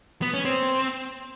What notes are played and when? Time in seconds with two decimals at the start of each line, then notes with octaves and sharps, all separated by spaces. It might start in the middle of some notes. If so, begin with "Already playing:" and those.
0.22 B3
0.34 C#4
0.45 C4